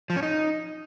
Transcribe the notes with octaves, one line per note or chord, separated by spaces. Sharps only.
F3
C#4
D#4